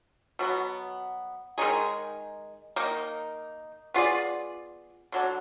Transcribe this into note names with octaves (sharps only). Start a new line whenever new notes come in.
B2 F#3 B3
D#3 G#3 D#4 G#4
D#3 A#3 D#4
B3 F4 G#4 D5
D3 F#3 D4